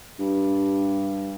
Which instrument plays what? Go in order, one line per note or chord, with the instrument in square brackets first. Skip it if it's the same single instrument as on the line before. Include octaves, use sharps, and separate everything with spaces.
[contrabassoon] G2